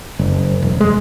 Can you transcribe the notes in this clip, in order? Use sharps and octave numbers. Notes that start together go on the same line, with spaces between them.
F#1
E1
G#3